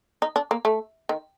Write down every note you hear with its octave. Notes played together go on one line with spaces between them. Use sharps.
D#4
D4
A#3
A3
D#3